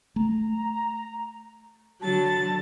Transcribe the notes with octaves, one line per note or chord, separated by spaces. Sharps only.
A3 A#5
D3 F#3 A5 A6